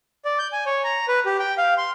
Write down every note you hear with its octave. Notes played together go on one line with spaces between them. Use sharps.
D5
G6
G#5
C#5
A#5
B4
G4
G5
F5
C6